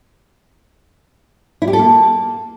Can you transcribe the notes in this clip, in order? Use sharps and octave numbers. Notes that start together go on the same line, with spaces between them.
E4
G4
A4
A#3